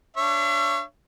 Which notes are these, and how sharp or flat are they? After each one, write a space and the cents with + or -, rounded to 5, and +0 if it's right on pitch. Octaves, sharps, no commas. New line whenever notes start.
D4 +0 C#5 -5 E5 +45